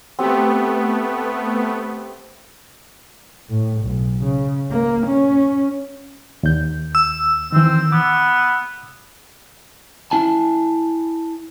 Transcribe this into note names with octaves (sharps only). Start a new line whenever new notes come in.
A3 B3 C4 G4
A2
B1
C#3
A#3
C#4
D#2 G6
E6
D#3 E3 C4
B3 D6
E4 G#5 A5